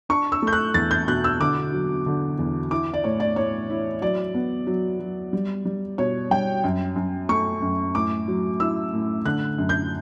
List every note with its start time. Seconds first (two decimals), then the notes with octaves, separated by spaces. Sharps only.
0.09 D4 C#6
0.32 E6
0.42 A3 G6
0.53 F#6
0.74 E2 A6
0.91 G6
1.07 B2 F#6
1.24 E6
1.40 D3 D6
1.73 F#3
2.06 D3
2.39 E2
2.71 E4 D6
2.93 D5
3.04 A2 C#5
3.20 D5
3.36 A2 C#5
3.70 E4
4.01 F#3 D5
4.34 B3
4.67 F#3
5.00 F#3
5.33 G3
5.65 G3
5.98 B2 C#5
6.31 G3 G5
6.64 F#2
6.96 F#2
7.29 A3 C#6
7.62 F#2
7.95 A2 D6
8.28 F#3
8.60 E4 E6
8.93 A2
9.25 D3 F#6
9.58 F#2
9.69 G6